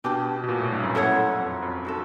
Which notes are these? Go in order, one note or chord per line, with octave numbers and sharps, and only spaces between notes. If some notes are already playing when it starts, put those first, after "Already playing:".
B2 D4 G4 B4
B2
A#2
A2
G2
F#2
E4 A4 C#5 F#5
F2
F2
D#4 F#4 A4